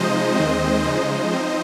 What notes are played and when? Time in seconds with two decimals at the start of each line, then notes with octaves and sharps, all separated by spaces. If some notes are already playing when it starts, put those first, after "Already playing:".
Already playing: C3 F3 G#3 D#4 C5 D#5
0.35 D#2 D#3 G#3 C4
0.84 C#3 F3 G#3 D#4 C5 D#5
1.33 F3 C4 D#4